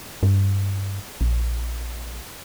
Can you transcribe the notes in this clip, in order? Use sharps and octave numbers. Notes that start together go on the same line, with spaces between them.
G2
A#1